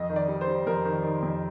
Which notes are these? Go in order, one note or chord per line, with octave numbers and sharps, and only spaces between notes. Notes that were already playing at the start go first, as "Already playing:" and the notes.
Already playing: F2 D#5
D#3
D5
G3
C5
G3
F2 A#4
D#3
D#3
F2